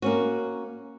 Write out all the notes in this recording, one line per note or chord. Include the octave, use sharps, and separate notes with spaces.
A#3 C#4 F#4